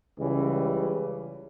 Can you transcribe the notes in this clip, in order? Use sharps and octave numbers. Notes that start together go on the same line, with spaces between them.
C#2 C#3 E3 G3